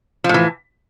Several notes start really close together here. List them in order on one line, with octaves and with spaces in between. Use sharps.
F3 A2 E3